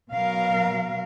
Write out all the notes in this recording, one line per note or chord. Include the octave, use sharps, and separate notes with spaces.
B2 F#3 A#4 F5